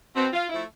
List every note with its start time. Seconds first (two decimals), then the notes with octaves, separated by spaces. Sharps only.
0.16 B2 B3 C4
0.33 F4
0.50 F3 A3 E4